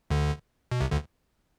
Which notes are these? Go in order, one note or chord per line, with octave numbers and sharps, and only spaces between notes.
D2 D3
B2
C2 C3
D2 D3